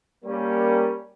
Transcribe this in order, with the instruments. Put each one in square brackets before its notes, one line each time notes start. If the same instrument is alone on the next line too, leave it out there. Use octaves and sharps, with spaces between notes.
[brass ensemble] G3 A#3 C#4